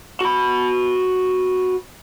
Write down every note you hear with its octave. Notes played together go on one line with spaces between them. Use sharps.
F#4 B5